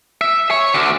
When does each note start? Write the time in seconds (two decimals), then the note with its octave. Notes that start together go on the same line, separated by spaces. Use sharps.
0.21 E5
0.51 C#5
0.74 D2 D3